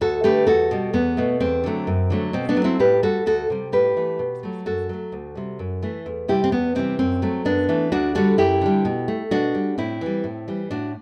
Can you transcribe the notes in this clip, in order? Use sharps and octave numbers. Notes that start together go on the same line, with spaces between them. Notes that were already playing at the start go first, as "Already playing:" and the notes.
D2 F#4 A4
D3 A3 G4 B4
E2 F#4 A4
B2 G3
E2 B3
B2 A3
E2 C4
D3 F#3 A3
F#2
D3 F#3 A3
B2 C4
B3 D4
F#3 A3
C4 E4
A2 G4 B4
G3 F#4 A4
D2 F#4 A4
C3 G3
A2 G4 B4
E3 A3
B2
F#3 A3
F#2 F#4 A4
F#3 A3
D2
C3 G3
F#2
E3 A3
E2
C3 G3 E4 G4
C4
E2 B3
C3 E3 G3 C4
F#2 C4
F#3 A3
F#2 B3 D4
E3 A3
D2 D4 F#4
D3 G3 F#4 A4
F#2 E4 G4
D3 G3
B2
A3
B2 D4 F#4
G3
A2 C4 E4
E3 G3
A2
E3 G3
A2 D4 F#4